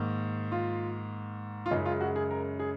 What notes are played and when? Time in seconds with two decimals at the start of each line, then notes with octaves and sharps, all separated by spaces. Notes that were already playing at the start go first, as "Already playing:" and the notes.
Already playing: G#2 D#3 A#3
0.52 F4
1.66 F4
1.71 F#2 C#3 G#3 D#4
1.86 F4
2.01 F#4
2.16 G#4
2.31 A#4
2.60 G#4